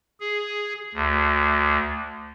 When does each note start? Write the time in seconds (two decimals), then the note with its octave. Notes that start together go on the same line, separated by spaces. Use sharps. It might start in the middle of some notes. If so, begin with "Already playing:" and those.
0.20 G#4
0.94 D2